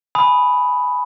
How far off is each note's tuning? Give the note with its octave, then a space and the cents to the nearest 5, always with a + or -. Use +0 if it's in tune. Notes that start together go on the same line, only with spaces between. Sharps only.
G#5 +15 B5 +0 D#6 +10